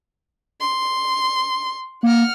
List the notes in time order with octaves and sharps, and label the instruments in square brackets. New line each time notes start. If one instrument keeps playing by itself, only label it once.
[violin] C6
[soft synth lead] A#3 [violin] F#5 F6